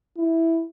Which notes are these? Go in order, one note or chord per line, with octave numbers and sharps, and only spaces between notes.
E4